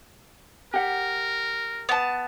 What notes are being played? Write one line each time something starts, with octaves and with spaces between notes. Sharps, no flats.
G4 A#4 F#5
B3 A5